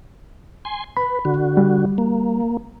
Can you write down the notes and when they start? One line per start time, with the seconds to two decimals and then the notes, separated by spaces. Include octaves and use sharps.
0.65 G#5 C6
0.97 B4 B5
1.25 D3 F#4
1.57 G3
1.98 A#3